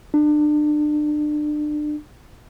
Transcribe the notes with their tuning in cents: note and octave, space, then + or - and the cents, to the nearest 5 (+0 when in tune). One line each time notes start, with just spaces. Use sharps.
D4 +30